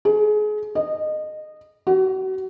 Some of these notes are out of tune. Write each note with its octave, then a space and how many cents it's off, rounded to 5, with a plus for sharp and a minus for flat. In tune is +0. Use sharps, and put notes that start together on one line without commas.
G#4 +30
D#5 -20
F#4 +35